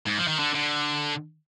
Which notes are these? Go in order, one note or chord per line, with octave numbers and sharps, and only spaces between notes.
G#2
F3
D#3
D3
D3